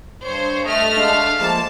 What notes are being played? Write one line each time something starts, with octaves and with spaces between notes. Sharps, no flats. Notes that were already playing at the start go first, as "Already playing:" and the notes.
G2 C5 C#5
A3 D#5 F6
G#3 D4 F5
F3 G#3 A#3 A5